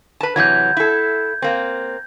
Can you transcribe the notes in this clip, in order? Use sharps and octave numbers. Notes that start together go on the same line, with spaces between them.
B4 A5
C3 E3 F#3 G6 G#6
E4 A4
A#3 C4